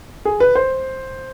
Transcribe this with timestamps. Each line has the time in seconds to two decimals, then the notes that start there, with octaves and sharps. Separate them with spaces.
0.25 G#4
0.40 B4
0.55 C5